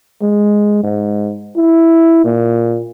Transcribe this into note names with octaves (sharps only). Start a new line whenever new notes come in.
G#3
G#2
E4
A#2